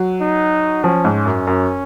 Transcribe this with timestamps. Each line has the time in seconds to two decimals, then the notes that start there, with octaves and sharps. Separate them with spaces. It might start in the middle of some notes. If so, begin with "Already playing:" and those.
Already playing: F#3
0.21 D#4
0.84 F3 C#4
1.05 G#2
1.26 F#2
1.47 F#2